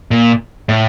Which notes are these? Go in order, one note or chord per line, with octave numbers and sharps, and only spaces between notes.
A#2
A2